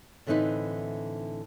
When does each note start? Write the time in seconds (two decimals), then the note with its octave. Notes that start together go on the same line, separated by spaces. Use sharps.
0.27 A2 D3 E3 C4 D#4 B4